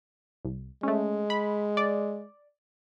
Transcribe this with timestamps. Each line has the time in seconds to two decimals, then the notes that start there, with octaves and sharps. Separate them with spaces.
0.45 C2
0.83 G#3 A3 C#4
1.30 B5
1.77 D5